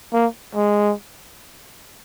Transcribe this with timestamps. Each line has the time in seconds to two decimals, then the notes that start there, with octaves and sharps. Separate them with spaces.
0.13 A#3
0.56 G#3